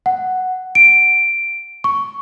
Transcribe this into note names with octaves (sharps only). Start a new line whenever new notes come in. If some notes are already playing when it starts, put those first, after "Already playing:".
F#5
D7
C#6